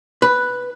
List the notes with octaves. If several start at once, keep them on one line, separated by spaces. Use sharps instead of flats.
B4